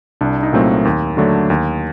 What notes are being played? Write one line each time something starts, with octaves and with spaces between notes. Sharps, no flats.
C2 D4
D#4
A#2 F#3 A3 C4
D#2
D3 F#3 A3 D4
D#2